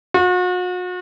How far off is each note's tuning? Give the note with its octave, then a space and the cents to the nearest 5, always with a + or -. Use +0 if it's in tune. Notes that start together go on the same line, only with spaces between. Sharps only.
F#4 -40